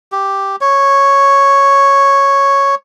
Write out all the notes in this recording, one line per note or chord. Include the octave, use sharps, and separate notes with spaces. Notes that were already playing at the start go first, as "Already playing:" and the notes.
G4
C#5